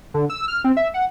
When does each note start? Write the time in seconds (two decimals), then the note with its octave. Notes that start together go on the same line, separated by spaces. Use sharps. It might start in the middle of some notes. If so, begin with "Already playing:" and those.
0.14 D3
0.30 E6
0.48 F6
0.64 C4
0.77 E5
0.94 F#5